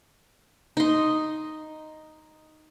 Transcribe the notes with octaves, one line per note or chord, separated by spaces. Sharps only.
D#4 C6